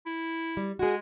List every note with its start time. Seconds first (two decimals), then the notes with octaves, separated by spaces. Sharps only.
0.06 E4
0.57 G3
0.79 G#3 F#4 G#4